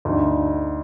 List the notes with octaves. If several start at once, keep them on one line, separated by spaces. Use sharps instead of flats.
D2 D3 D#4